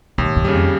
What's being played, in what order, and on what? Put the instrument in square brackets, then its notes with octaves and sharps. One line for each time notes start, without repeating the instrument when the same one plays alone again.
[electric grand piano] D#2 [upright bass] G#2
[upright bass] G2
[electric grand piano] C#3 G3
[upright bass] F2